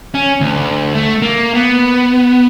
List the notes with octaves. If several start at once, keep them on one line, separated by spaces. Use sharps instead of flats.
C#4
D2
A3
A#3
B3